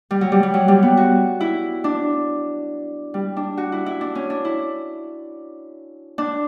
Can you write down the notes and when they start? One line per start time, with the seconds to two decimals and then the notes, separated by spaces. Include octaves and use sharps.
0.11 G3
0.21 F#3
0.32 G3
0.43 G3
0.54 F#3
0.68 G3
0.83 B3
0.97 F#4
1.40 E4
1.84 D4
3.14 G3
3.37 D4
3.57 F#4
3.72 E4
3.86 E4
4.01 D4
4.15 C#4
4.30 D4
4.45 E4
6.18 D4